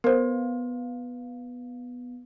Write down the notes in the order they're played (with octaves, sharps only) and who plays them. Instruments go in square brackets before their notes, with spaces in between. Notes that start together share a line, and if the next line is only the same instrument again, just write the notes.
[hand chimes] B3 [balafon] A#4 C5